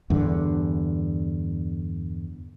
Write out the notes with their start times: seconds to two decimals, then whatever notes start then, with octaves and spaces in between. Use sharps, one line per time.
0.10 E2 G2 D3